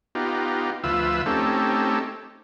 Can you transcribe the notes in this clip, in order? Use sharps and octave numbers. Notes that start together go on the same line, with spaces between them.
B3 D#4 F4 G4
D2 F3 F4 B4 E5 E6
A3 C4 C#4 D#4 G4 A4